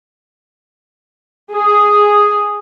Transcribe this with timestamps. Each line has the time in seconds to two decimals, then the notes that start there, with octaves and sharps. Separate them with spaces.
1.51 G#4